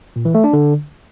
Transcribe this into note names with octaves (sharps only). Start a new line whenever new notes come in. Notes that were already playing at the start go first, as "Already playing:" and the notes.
A#2
E3
A3
D4
D3